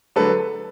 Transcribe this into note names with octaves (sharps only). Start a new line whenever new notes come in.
D3 F#3 A4 B4